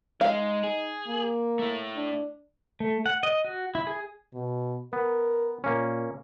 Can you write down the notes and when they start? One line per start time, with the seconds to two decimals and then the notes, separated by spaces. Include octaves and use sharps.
0.21 G#3 D#4 F5
0.64 G#4
1.07 A#3
1.59 A3 E4
1.96 D4
2.80 A3
3.06 F#5
3.23 D#5
3.45 F#4
3.75 E4
3.87 G#4
4.34 B2
4.93 B3 A#4
5.64 A#2 A#3 C#4